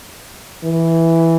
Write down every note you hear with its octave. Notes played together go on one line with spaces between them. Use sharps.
E3